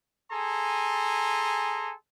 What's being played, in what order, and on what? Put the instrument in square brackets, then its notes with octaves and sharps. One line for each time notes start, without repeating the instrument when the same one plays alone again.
[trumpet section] G#4 A4 G#5 A#5 C6